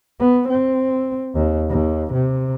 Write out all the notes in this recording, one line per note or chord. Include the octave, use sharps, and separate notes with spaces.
B3
C4
D#2
D#2
C3